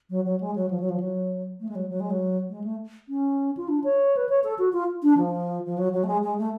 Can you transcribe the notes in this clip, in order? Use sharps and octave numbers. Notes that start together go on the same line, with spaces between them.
F#3
F#3
G#3
F#3
F3
F#3
F3
F#3
A3
G#3
F#3
F#3
G#3
F#3
G#3
A3
C#4
F4
D4
C#5
B4
C#5
A4
F#4
F4
D4
F3
F3
F#3
F#3
A3
G#3
G#3
A3